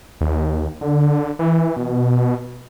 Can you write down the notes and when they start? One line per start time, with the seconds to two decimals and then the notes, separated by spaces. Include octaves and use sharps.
0.21 D#2
0.81 D3
1.39 E3
1.76 B2